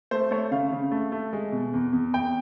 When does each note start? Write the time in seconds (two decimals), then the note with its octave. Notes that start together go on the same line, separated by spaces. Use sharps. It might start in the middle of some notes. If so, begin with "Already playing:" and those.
0.11 A3 C5
0.31 A3 C#5
0.51 C#3 F5
0.72 C#3
0.92 A3
1.12 A3
1.33 G#3
1.52 B2
1.73 E2
1.93 E2
2.14 E2 G5